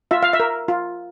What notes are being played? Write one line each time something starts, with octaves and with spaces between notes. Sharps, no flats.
F4 E5
F5
E5
A#4
F4